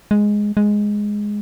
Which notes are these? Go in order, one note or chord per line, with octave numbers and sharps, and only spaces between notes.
G#3
G#3